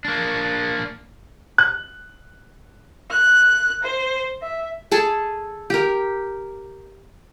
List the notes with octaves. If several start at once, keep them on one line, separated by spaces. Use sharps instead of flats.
A#3 D4
F#6
F#6
C5
E5
G#4 A4 A5
G4 A#4